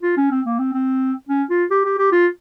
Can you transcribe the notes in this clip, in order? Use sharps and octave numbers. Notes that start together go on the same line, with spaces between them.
F4
C#4
C4
A#3
C4
C4
C#4
F4
G4
G4
G4
F4